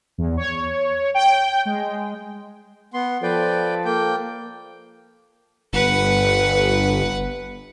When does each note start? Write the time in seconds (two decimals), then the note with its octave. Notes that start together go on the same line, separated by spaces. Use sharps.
0.18 E2
0.37 C#5
1.14 G5
1.65 G#3
2.94 B3 C6
3.23 F3 A4 B4 D5 G5
3.85 A#3 G5
5.73 G1 B4 F#5